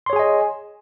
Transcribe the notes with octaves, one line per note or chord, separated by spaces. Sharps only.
G#4 C#5 D#5 G#5 C6